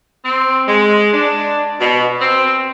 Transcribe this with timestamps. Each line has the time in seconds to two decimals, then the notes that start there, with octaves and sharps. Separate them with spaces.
0.25 C4
0.68 G#3
1.14 D4
1.80 B2
2.21 C4